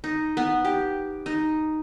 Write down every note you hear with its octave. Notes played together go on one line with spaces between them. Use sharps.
D#4
B3
G4
D#4